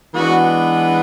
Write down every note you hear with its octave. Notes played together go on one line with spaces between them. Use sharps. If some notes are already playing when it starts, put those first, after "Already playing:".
E3 G#3 B3 D4 F#4